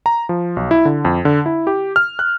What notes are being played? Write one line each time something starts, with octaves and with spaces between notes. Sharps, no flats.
A#5
F3
B1
E4
D3
F2
D3
E4
G4
F6
F#6